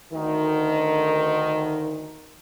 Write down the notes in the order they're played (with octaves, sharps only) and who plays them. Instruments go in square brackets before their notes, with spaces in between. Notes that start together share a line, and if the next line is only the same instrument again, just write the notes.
[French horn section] D2 D#3